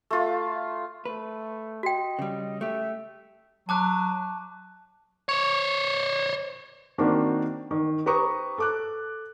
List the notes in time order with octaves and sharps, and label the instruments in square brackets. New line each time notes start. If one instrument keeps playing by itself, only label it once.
[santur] A3 F4
[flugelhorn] A3 [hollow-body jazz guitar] B4
[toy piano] F#4 G5 [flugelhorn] D#5
[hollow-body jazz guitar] C#3 G3
[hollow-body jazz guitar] A3 G4 [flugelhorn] E5
[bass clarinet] F#3 [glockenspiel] A5 D6 F#6
[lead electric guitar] C5 C#5
[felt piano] D#3 A#3 C4 D4 F#4
D#3
G4 B4 C5 A#5 C#6 D#6
A4 D6 F#6